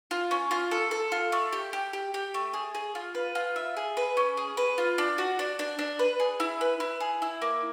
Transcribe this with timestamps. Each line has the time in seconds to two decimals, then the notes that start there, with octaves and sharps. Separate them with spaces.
0.11 F4
0.31 C#4
0.51 F4
0.71 A4
0.91 A4
1.12 F4
1.32 A3
1.52 G4
1.73 G4
1.93 G4
2.14 G4
2.34 A3
2.54 G#4
2.75 G#4
2.95 F4
3.15 B4
3.35 F4
3.56 E5
3.77 G#4
3.97 B4
4.17 C#4
4.37 G#4
4.57 B4
4.78 F4
4.98 D4
5.18 F#4
5.39 D4
5.59 D4
5.79 D4
5.99 B4
6.20 G#4
6.40 E4
6.61 B4
6.80 E4
7.00 G#4
7.22 E4
7.42 A#3